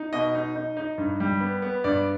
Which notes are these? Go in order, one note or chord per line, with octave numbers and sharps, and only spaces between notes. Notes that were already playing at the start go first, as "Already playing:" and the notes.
Already playing: D#4
B2 D#5
D#4
D#4
D#4
G2
G3
B3
B3
G2 D5